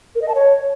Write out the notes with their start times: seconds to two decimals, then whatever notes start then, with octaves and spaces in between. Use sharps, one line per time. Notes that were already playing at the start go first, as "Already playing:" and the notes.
0.15 A#4
0.22 D#5
0.28 A5
0.35 C#5